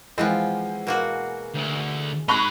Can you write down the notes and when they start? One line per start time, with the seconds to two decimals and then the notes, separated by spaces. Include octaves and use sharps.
0.18 E3 F3 G#3 B3 C4
0.87 B2 A#3 F#4
1.54 D2
2.28 D#4 G#4 B5 C#6 F#6